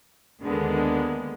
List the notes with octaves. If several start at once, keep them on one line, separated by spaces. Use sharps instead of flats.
D#2 D3 G#3 A#3 B3